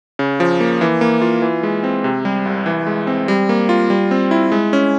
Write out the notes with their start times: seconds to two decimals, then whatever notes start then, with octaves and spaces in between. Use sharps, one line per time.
0.19 C#3
0.40 F3
0.60 A#3
0.81 E3
1.01 A#3
1.21 F4
1.42 E3
1.63 G#3
1.84 C4
2.04 C3
2.25 G3
2.46 C2
2.66 E3
2.87 G#3
3.07 C4
3.28 G3
3.49 A#3
3.69 F4
3.90 G3
4.11 C4
4.31 E4
4.52 G#3
4.73 C#4